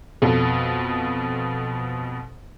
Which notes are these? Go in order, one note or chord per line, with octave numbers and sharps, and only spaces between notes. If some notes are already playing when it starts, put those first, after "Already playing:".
F2 B2 A4